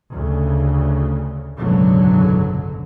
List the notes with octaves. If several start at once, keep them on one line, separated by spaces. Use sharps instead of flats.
D2 C#3
F#1 B1 G#2 B2 D3 F#3